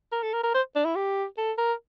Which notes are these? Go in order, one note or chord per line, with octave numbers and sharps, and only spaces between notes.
A#4
A4
A#4
A#4
C5
D4
E4
G4
A4
A#4